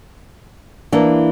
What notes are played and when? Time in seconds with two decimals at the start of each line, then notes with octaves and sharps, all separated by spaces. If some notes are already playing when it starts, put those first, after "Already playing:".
0.92 E3 A#3 D4